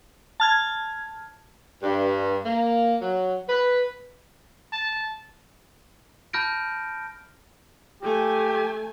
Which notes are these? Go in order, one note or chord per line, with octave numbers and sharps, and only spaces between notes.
A5 F6 G#6
G2
A#3
F#3
B4
A5
A5 B5 F6 G6 A#6 D7
A3 G4 G#5